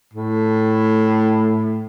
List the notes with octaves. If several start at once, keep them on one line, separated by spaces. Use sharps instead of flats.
A2